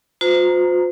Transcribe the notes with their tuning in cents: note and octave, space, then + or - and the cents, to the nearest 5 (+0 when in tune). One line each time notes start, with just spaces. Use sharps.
F4 +45 C5 -35 A#5 +0